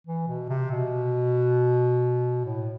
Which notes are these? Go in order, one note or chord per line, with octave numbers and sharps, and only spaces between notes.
E3
B2
C3
B2
A2